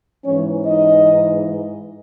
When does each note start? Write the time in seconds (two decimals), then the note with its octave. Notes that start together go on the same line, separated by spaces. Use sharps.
0.25 G#2 E3 G#3 C#4 C#5
0.64 D#4 D#5